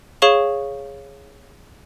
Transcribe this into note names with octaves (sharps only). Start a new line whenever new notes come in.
G#4 C#5 F5 C#6 E7 G7